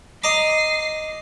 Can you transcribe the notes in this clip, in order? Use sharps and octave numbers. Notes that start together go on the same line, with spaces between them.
D#5 A#5 D6 C7